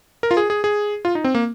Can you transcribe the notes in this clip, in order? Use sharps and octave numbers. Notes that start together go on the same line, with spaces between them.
A#4
F4
G#4
G#4
G#4
F4
D#4
C4
A#3